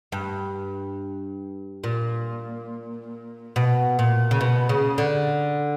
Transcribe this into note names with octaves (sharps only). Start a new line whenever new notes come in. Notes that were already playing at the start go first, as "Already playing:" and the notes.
G2
A#2
B2
A#2
C#3
B2
C#3
D3